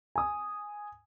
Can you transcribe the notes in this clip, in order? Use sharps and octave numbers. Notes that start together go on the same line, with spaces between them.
G#5 D#6